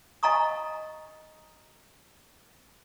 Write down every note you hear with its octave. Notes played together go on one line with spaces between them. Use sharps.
D#5 F5 G#5 A#5 C#6 D#6